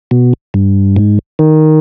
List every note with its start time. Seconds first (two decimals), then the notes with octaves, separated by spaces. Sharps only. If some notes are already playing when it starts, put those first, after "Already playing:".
0.11 B2
0.54 G2
0.96 G#2
1.39 D#3